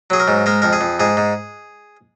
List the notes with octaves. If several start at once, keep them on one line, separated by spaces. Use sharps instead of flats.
F#3 G#4
A#4
G#2
G#3 A#4
F2 A#4
G#4
F2
G#2 G#4
G#2